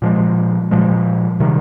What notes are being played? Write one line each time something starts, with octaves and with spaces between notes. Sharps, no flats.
A#2 F3 G#3
A#2 F3 G#3
C3 D#3 G3